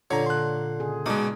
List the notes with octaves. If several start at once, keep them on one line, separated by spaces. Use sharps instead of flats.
A#2 D3 D4 F4 C#5 A#5
C6 F#6
C#3 G#4
B2 G#3 D4 D#4